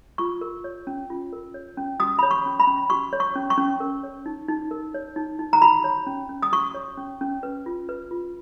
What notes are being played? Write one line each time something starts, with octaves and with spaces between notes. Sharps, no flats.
F4 C#6
A#4
C#5
C#4
F4
A#4
C#5
C#4
F#4 D#6
C#5 B5
C#6
C#4
B5
C#4
F#4 C#6
C#5
C#6
C#4
C#6
C#4
A#4
C#5
D#4
D#4
A#4
C#5
D#4
D#4
A#5
F#4 B5
C#5
C#4
C#4
D#6
F#4 C#6
C#5
C#4
C#4
B4
F4
B4
F4